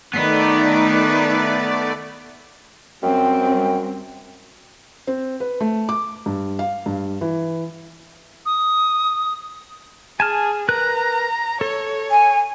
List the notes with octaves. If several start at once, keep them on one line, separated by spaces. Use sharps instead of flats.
D#3 A3 B3 D#4 B4 D5
F#2 G3 C4 G5
C4
B4
A3
D6
G2
F5
G2
E3
D#6
G#4 G#5 A5 F6
A#4 B4 A#5 F#6
A4 C#5
G#5